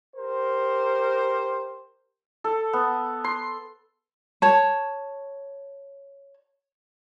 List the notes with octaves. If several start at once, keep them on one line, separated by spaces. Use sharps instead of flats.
G4 A#4 C5
A4
B3
C6
C#5 A5